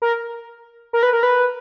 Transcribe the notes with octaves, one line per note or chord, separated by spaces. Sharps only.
A#4
A#4
B4
A#4
B4